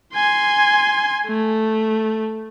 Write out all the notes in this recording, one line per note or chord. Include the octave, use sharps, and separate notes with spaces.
G#5 C6
A3